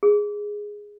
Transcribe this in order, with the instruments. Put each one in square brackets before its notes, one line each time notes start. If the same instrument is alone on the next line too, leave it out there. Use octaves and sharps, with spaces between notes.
[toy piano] G#4